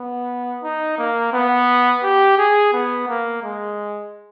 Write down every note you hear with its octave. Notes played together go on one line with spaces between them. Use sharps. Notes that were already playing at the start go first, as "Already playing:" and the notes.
Already playing: B3
D#4
A#3
B3
G4
G#4
B3
A#3
G#3